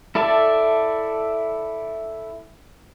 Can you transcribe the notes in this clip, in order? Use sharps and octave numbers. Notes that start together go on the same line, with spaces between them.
E4 A4 D5 E5 A5